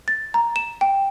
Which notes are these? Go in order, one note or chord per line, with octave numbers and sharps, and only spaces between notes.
A6
A#5
E7
G5